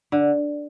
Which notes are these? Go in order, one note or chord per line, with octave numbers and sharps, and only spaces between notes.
D3